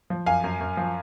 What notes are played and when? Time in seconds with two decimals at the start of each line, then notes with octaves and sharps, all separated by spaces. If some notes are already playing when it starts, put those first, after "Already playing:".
0.10 F3
0.26 F#2 F5 G#5
0.44 F#2
0.61 F#2
0.77 F3